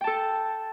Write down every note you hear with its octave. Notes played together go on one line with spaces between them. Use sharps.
A4 G5 A5